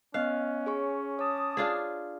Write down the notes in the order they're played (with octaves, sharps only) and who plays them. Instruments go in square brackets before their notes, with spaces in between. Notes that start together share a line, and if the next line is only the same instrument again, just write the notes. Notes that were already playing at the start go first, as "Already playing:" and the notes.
[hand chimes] B3 D#5 F#6 [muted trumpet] C#4 [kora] F5
[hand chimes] G#4 C#5 C#6
[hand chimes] C#5 [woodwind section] A5 D6 D#6
[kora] D4 F4 G#4